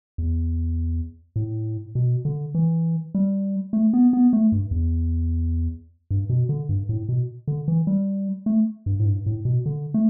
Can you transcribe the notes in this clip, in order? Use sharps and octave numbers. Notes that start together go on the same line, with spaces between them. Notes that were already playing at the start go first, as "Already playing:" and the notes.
E2
A2
B2
D3
E3
G3
A3
B3
B3
A3
G2
E2
G2
B2
D3
G2
A2
B2
D3
E3
G3
A3
G2
A2
G2
A2
B2
D3
A3